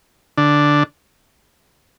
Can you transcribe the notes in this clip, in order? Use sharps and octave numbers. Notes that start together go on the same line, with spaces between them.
D3 D4